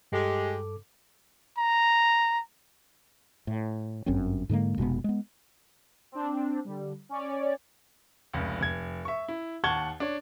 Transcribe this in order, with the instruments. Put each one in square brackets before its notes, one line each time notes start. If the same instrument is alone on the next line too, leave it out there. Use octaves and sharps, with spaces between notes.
[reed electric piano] G2 A4 D6 [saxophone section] G#3 G4
[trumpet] A#5
[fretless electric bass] A2
G1 F#2 C4 C#4
G#2 D3 G#3 A#3
F1 B2 G#3 B3
G#3 B3
[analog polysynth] C4 D4
D3 G3
C#4 C#5 D5
[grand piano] F1 C#2
F1 G#6
E5 C#6
E4
D#2 F#5 A5 C#6 G#6 G7
D4 C#5